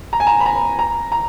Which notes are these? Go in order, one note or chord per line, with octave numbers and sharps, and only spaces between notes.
A#5
G#5
A#5
B5
A#5
A#5
A#5